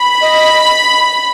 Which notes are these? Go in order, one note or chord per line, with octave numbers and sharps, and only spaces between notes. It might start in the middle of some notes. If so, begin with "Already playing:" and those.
Already playing: B5
D#5